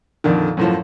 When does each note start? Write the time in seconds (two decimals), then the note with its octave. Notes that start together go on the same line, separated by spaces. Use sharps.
0.24 F2 A#2 D3 D#3
0.57 F#2 A2 F3